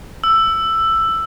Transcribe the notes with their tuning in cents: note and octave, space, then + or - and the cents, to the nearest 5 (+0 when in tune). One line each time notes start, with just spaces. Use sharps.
E6 +10